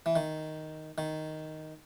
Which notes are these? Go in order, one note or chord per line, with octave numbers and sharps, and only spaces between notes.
E3
D#3
D#3